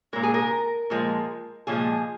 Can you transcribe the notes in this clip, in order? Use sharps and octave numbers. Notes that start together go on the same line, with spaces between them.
A#2 G#3 A#4
G#4
A#4
A#2 F3 G#3
A#2 F3 G#3 G#4